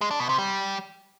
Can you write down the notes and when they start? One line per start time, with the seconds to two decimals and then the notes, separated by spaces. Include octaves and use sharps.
0.01 G#3
0.11 D4
0.20 B2
0.29 C3
0.38 G3